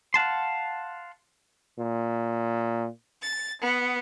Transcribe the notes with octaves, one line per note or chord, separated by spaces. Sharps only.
F5 F#5 A5 C6
A#2
A6
B3